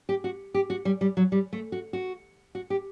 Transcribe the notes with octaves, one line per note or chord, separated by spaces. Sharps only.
G4
F#4
G4
F#4
G3
G3
F#3
G3
A3
F#4
F#4
F#4
G4